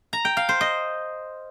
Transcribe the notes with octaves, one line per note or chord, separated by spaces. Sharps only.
A#5
G5
F5
C5
D#5